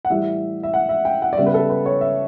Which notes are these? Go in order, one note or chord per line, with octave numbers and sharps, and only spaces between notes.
F#5
A2 E3 G3 E5
E5
F#5
E5
G5
F#5
D5
C#3 G3 B3 E5
B4
A4
B4
C#5
E5